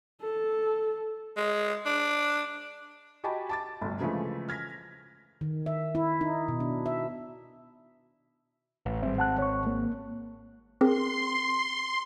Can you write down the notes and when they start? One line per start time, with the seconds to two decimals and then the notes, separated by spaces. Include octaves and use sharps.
0.22 A4
1.37 G#3
1.86 D4
3.24 F#4 G4 D#5 G#5 A5 B5
3.49 A5 D6 A6
3.81 G1 D2
4.00 C#3 E3 F3 G#3 A3
4.48 F6 G#6 A#6 B6
5.41 D#3
5.66 E5
5.95 E4
6.21 D#4
6.48 B2
6.60 D4
6.86 E5
8.86 A1
9.02 G#1 G3 C4 E5
9.18 F#5 A5 F#6
9.38 C#5 C#6
9.67 A#3
10.81 C4 G#4 A#4 C6